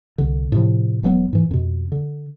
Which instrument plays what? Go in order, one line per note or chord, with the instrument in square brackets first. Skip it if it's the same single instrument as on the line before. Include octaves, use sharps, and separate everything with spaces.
[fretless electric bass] C2 D3
A2 C3 F3
E1 G2 F#3 B3
G#2 E3
F2 B2
D3